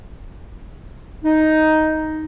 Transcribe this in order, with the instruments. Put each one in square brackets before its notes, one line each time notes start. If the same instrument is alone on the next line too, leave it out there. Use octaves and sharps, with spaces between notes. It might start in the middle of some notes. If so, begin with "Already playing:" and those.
[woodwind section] D#4